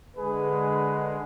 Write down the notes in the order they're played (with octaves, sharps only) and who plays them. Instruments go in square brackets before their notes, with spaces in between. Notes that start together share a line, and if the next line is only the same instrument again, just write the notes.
[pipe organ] D3 G#3 [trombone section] G#4 B4